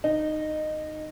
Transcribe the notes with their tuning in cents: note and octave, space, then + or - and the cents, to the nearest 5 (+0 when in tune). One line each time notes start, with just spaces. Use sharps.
D#4 -15